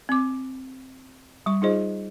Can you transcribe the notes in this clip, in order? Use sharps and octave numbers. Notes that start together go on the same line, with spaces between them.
C4 D6
G3 C#6
D#4 F4 G#4 C5 D#5